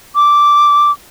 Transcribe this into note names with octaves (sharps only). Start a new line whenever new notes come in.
D6